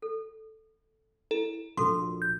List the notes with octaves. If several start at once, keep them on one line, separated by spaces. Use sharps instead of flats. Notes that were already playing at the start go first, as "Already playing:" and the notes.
A4
E4 A4
A#1 F#4 A4 A#4 C6
G6